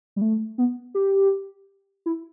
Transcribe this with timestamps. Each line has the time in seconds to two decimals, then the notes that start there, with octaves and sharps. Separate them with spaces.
0.16 G3
0.22 A3
0.58 B3
0.95 G4
2.06 E4